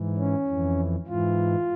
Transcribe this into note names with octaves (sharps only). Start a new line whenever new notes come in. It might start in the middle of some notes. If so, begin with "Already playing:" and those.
Already playing: G#2 E3
C#4
F2 E3
G#2 E3 F4